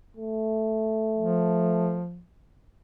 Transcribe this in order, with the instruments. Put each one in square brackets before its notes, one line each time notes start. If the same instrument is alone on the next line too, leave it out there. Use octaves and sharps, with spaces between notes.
[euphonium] A3
[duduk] F3